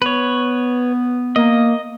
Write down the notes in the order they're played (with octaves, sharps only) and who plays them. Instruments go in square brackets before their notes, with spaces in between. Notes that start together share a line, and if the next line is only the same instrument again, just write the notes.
[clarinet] B3 [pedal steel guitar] B4 C#5
[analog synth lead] A#3 [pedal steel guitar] D#5